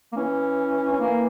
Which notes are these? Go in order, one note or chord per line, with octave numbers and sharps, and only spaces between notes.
A#3
E3 C#4
C#4
A#3